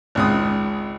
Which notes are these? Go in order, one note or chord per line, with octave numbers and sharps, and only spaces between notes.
G#1 C#2 D#6